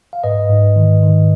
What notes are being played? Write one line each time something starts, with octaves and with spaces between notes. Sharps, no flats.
F5
G#2 B4 D#5
G#2
D#3
D#3